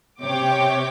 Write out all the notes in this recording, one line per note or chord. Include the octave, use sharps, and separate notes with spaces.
C3 C#5 G5 D6